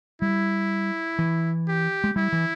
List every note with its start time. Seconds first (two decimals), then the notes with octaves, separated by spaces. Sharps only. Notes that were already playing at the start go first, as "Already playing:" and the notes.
0.22 G3 E4
1.19 E3
1.68 G4
2.04 G#3
2.16 G3 E4
2.32 E3